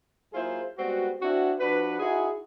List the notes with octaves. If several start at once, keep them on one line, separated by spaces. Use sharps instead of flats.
F#3 A#3 E4 F4 G#4 C5
G3 G#3 B3 C4 F#4
C4 D4 E4 F#4
F3 D4 F#4 B4
D#4 E4 F#4 G#4